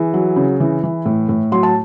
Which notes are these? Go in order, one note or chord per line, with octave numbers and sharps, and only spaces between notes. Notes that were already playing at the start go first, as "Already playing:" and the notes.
Already playing: E3 G#4 G#5
F#3
C#3
E3
E3
A2
A2
F#3 C6
A5